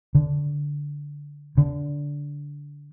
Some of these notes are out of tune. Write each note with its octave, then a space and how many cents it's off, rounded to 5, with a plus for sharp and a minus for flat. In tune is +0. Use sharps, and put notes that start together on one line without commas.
D3 -10
D3 -20